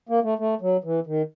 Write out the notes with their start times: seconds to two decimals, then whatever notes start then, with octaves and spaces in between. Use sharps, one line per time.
0.09 A#3
0.24 A3
0.39 A3
0.61 F#3
0.84 E3
1.06 D#3